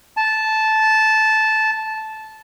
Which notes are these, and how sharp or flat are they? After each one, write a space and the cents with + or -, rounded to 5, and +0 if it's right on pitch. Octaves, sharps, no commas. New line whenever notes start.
A5 -10